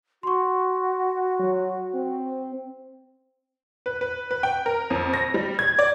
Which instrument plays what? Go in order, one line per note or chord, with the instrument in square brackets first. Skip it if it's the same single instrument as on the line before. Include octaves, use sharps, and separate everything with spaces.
[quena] F#4 [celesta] C6 C#6
[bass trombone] F#3
C4
[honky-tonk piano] B4
B4
B4
G5
A#4
F2
A#6
G3
G#6
D5